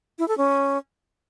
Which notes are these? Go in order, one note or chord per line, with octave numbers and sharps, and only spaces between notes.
E4
A4
C#4